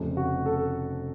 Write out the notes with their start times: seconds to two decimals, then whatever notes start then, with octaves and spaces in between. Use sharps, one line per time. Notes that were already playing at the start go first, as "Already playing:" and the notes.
Already playing: F1 F2 C#3 A3 C4
0.17 F#4
0.46 A4